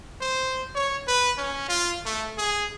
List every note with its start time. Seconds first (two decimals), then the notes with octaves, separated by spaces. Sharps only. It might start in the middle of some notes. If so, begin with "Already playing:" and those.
0.21 C5
0.75 C#5
1.07 B4
1.38 C#4
1.69 F4
2.06 A3
2.38 G#4